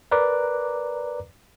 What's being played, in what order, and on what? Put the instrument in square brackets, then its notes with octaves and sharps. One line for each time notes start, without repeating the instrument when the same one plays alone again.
[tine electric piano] A#4 B4 D5 A#5 D6 F#6